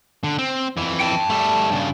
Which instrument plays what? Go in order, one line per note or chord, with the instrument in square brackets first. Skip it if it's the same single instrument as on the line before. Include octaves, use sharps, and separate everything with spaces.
[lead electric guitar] D3
C4
F2 E3
[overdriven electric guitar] G5 A5
[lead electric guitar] G3 A3
G2 C#3